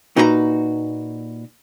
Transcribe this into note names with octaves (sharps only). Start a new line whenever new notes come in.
A#2 D#4 F#4 B4 C#5 A#5